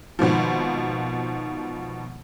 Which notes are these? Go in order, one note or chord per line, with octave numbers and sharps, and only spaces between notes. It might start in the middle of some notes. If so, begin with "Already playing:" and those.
G#1 B2 D#3 F3